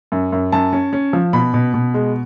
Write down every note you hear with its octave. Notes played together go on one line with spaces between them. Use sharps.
F#2
F#2
F#2 A5
C#4
C#4
F3
B2 B5
B2
B2
G#3